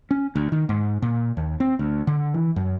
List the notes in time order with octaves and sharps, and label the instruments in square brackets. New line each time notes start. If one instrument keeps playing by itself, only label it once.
[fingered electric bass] C#4
D2
D#3
G#2
A#2
D#2
C4
D2
D3
E3
F#2